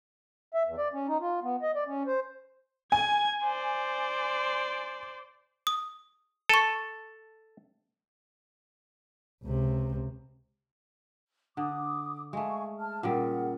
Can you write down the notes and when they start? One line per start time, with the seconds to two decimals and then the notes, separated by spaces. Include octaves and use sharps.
0.54 E5
0.66 E2
0.78 D5
0.94 C#4
1.08 D#4
1.21 F4
1.43 B3
1.62 D#5
1.75 D5
1.87 C#4
2.07 C5
2.92 G#5 G#6
3.44 C5 D5
5.67 D#6
6.49 A4 A5 C#6
9.43 C#2 C3
11.57 D3 D6 D#6
12.33 G#3 A3 F5 G#5 C#6
12.80 A5 F6
13.03 A#2 C#3 G3 G#4 A#4 F#5